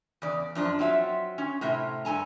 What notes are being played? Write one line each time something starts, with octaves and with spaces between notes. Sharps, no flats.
E2 C#3 D5
F#2 F3 D4
F#3 C4 F4 E5
C#4
A2 C3 F4 E5
G2 A4 G#5 A#5